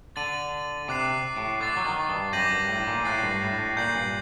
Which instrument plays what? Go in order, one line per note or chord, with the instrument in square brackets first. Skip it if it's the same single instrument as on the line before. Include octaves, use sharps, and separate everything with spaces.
[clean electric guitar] D3 [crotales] A6 D#7 F#7
[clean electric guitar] C3 [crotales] D6 F#6 C7
[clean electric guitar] A2
[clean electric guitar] D3 [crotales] D6 A6 C7
[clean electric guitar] F#3
D#3
G2
[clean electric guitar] F#2 [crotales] D6 G6 A#6 D#7 F#7
[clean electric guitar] G2
A2
A#2
[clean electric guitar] A2 [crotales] F#6 A6 C7
[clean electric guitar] G2
A2
A2
[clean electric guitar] A#2 [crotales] G6 C7 F#7
[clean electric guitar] G2